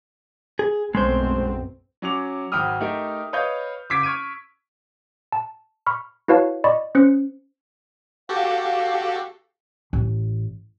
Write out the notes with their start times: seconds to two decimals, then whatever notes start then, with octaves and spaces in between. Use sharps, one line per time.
0.59 G#4
0.95 B1 F#2 G#3 A3 C4 C5
2.02 F#3 C#4 D6 F7
2.52 G#1 F#3 G5 B5 D#6 F6
2.80 A3 D#4 G4 A#4
3.33 B4 C#5 D#5 F5 G6
3.90 F#1 D6 E6 G#6 B6 D7
4.03 C#6 F6 G#6 D7 D#7
5.32 A5
5.87 B5 C#6 F6
6.28 E4 F#4 B4 C#5 F5 A5
6.64 D5 D#5 B5 C#6
6.95 C#4 C5 F#6 C#7
8.29 F#4 G4 A4 F5
9.93 A1